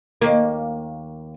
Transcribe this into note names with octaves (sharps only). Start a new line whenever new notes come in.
D#2 A#3